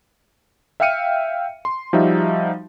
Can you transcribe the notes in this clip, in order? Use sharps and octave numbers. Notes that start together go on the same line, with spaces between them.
E5 F5 G5 F6 C#7 D#7
C6
F3 G3 D#4 F#4 E5